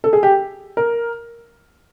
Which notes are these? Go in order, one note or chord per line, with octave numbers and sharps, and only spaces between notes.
A4
G#4
G4
A#4